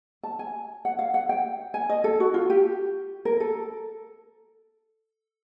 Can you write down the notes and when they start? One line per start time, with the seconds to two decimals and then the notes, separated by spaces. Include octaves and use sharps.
0.23 A5
0.39 G#5
0.85 F#5
0.99 F5
1.14 F#5
1.29 G5
1.74 G#5
1.89 D#5
2.04 A4
2.20 F#4
2.34 F4
2.50 G4
3.25 A#4
3.40 A4